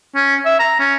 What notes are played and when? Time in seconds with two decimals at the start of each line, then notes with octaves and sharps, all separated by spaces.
0.15 C#4
0.45 E5
0.59 A#5
0.79 C#4